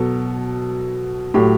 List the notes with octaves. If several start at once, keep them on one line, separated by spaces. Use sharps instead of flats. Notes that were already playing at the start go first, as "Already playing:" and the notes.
Already playing: B2 F#3 A4
A2 F#3 G4